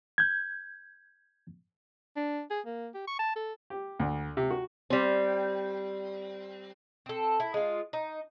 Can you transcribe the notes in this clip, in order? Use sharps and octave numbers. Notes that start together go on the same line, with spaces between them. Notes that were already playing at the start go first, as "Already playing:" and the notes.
G6 G#6
D4
G#4
A#3
G4
C#6
A5
A4
G4
D2
C3
F#4
G3 C4
C4 A4
E4
G#3 F4
D#4